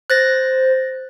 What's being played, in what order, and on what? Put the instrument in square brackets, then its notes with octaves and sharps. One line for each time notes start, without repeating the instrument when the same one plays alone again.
[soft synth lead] C5 [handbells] F#6 A6 A#6